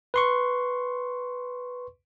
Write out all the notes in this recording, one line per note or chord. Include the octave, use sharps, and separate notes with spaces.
B4 C6 C#6